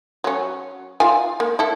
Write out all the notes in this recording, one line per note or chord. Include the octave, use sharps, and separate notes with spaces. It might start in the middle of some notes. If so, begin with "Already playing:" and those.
F#3 C#4
F4 F5 G#5
A#3
E4 A4